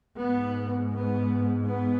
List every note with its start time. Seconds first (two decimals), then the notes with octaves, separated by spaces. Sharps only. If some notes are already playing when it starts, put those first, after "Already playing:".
0.19 G#2 B3
0.93 B3
1.65 B3